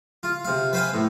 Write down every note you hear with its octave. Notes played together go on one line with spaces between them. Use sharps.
F4
C3 F5
B4 C5 F5 G5 G#5
A2